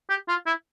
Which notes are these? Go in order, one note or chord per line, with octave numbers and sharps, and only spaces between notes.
G4
F4
E4